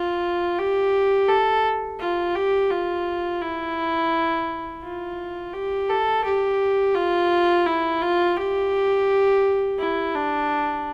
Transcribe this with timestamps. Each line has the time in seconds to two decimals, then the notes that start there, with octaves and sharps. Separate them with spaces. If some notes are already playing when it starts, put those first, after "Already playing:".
Already playing: F4
0.58 G4
1.29 A4
2.00 F4
2.35 G4
2.70 F4
3.41 E4
4.83 F4
5.53 G4
5.89 A4
6.24 G4
6.95 F4
7.66 E4
8.02 F4
8.37 G4
9.79 E4
10.14 D4